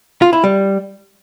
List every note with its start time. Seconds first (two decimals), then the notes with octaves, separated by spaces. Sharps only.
0.22 F4
0.33 E4
0.44 G3